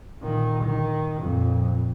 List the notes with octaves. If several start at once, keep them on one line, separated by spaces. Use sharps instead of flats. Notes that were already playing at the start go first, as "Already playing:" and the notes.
A#2 D#3
D#3
F2 A#2